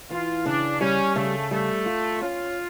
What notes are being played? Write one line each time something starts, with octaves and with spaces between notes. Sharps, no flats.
E3 F4
C#3 D4
G3 C#4
C#3 A3
G3 A3
F4
C#4 F4